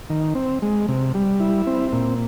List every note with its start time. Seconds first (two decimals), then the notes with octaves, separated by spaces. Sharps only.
0.10 D#3
0.35 C4
0.62 G#3
0.88 C3
1.14 G3
1.40 E4
1.67 C4
1.92 A#2